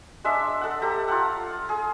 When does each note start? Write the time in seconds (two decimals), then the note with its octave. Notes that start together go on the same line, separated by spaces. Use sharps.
0.24 G#3 D4 E5
0.61 A4 F#5
0.81 G4 A4 A#5
1.08 F4 F#5
1.69 G#4